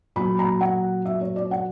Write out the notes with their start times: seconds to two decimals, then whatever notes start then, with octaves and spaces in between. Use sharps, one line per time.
0.16 A#2 F#3 B5
0.39 A#5
0.61 F#5
1.05 E5
1.21 C#5
1.36 D5
1.51 F#5